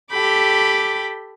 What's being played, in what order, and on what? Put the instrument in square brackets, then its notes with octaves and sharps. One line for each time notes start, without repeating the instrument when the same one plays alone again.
[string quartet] G4 A4 G5 B5 D6